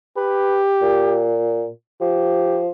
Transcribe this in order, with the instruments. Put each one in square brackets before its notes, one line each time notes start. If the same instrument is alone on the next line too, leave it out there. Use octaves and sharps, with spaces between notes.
[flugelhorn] G4 [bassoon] B4
[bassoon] A#2
[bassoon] F3 [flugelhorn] G4